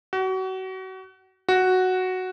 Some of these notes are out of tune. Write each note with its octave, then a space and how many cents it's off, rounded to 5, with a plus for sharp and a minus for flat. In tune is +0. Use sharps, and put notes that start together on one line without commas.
F#4 +30
F#4 +0